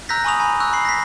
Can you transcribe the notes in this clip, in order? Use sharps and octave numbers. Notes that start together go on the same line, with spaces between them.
A#5 E6 F#6 G6 A#6 B6
G#5 B5 C#6 D#6 F7
G#5 A#5 B5
C#6 E6 F#6
B5 C7
A#6 B6